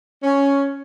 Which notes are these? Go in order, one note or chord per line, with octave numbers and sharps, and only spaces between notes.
C#4